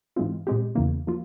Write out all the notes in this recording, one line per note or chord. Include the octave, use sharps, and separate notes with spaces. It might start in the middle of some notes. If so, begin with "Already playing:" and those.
G#2 E3 G#3 C4 F4
A#2 G#3 C4 G4
E2 C#3 E3 A#3
F3 A#3 F4